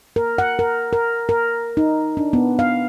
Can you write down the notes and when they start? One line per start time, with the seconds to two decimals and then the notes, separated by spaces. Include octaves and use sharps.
0.16 A#4
0.38 F#5
0.59 A#4
0.93 A#4
1.29 A#4
1.77 D#4
2.17 D4
2.33 B3
2.59 F5